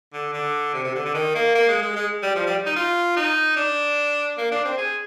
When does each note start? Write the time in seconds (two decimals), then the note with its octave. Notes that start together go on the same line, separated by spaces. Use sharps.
0.13 D3
0.33 D3
0.74 C3
0.84 C3
0.95 D3
1.05 D3
1.14 D#3
1.35 A#3
1.55 A#3
1.68 G#3
1.82 G#3
1.96 G#3
2.23 G3
2.36 F3
2.46 G3
2.66 D#4
2.76 F4
3.17 D#4
3.56 D4
4.38 A#3
4.52 D4
4.65 C4
4.78 G#4